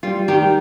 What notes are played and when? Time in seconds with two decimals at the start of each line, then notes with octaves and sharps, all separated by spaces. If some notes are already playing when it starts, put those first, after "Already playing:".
0.03 G3 F4
0.28 D#3 G4